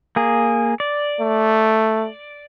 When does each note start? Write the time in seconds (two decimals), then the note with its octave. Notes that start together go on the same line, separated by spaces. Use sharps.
0.16 A#3 G#4
0.80 D5
1.20 A3